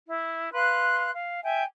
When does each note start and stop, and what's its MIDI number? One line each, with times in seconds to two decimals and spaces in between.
0.06 0.49 64
0.53 1.10 71
0.53 1.10 77
0.53 1.10 84
0.53 1.10 90
1.13 1.39 77
1.44 1.63 76
1.44 1.63 79
1.44 1.63 80